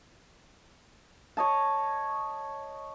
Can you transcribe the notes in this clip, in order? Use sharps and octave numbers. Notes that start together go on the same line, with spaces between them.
C#5 D#5 A5